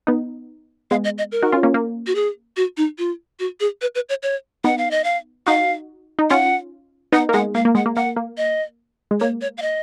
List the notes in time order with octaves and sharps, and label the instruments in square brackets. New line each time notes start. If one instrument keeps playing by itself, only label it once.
[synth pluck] B3 D#4
[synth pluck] G#3 B3 [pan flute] F5
[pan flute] D#5
D#5
A#4
[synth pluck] D#4 F#4
C#4 F4
A#3 C#4
A#3
[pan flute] F#4
G#4
F#4
D#4
F4
F#4
G#4
B4
B4
C#5
C#5
[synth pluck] B3 D#4 [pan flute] F#5
[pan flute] F5
D#5
F5
[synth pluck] D#4 F#4 [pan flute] F5
[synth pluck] D#4
[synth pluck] C#4 F4 [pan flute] F#5
[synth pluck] B3 D#4 [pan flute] F#5
[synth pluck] A#3
[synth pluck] G#3 [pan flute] F#5
[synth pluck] A#3 [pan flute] F5
[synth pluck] A#3
[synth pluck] G#3 [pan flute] F#5
[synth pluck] A#3
[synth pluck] A#3 [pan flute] F#5
[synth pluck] A#3
[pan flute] D#5
[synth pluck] G#3
[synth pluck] A#3 [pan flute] C#5
[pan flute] C#5
F5
D#5